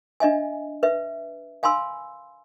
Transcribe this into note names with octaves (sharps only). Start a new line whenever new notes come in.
D4 D#5 E5 G#5
B4 E5
F5 G#5 B5 C6 E6